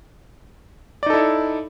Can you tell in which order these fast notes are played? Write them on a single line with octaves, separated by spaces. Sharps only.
D5 D#4 A4 E4